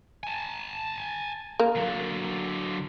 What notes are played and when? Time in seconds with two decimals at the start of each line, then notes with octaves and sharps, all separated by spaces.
0.23 G#5 A5
1.59 A#3
1.76 D3 F#3